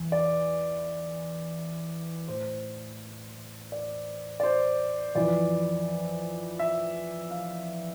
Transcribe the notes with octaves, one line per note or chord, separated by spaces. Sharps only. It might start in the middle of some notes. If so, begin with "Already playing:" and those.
Already playing: E2 E3
D5
A2 E3 C5
D5
D5
C5
F2 E3 D5
E5
F5